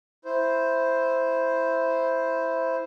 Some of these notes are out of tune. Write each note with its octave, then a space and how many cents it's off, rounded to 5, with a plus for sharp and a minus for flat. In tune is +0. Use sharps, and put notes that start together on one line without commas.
E4 +0 C5 +0